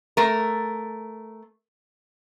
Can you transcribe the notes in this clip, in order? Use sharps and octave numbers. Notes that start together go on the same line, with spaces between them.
A3 A#4